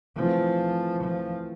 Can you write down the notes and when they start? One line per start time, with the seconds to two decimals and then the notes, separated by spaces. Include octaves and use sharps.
0.16 E3 F3 A3 C4 F4
1.04 F3